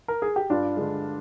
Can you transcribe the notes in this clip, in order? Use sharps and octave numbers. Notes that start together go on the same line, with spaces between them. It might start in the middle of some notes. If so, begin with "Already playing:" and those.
A#4
G#4
G4
G2 D4 F4
D3 G#3